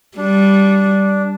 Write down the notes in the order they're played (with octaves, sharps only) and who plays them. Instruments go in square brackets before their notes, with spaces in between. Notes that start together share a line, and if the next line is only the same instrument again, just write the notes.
[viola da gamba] G3 [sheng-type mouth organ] D4